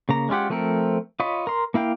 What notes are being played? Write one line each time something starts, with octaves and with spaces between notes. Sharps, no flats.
C#3 A#3 A#5
G#3 C#4 F4 G4 F#5
F3 A3 C4 A4 A#4
F4 C#5 D#5 B5
A#4 C6
A#3 E4 F5 G5